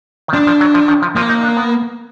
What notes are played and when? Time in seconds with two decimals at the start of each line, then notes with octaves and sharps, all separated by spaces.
0.28 D#3
0.33 F3 D4
0.47 F3
0.61 F#3
0.74 F3
0.88 D#3
1.02 F3
1.16 F3 A#3
1.29 D#4
1.43 D4
1.57 B3